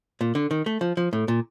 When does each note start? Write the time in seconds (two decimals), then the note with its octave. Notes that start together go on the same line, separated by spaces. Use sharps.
0.21 A#2
0.35 D3
0.51 D#3
0.66 A3
0.81 F3
0.97 F3
1.13 A2
1.28 A#2